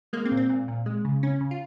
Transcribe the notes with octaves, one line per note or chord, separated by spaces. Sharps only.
G#3 A#3
C4
A#2
C4
A#2
A#2
G#3
C#3
C#3 C#4
C#3
F4